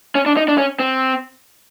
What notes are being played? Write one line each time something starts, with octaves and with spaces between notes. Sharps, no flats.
C#4
D4
D#4
D4
C#4
C4